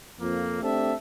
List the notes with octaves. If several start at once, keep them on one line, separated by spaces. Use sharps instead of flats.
F2 F3 A#3
A3 C4 D4 G4 E5 A5